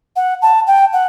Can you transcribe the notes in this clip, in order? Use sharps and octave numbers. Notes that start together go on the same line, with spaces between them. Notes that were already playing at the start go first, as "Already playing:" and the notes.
F#5
A5
G5
F#5